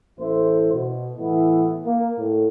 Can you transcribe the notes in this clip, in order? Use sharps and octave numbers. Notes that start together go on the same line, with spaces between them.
A1 A3 E4 C5
B2
A2 E3 B3 E4
A#3
A2